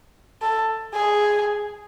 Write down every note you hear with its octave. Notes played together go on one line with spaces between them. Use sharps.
A4
G#4